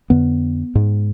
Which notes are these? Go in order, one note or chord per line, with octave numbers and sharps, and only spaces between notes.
F2 D3 B3
G#2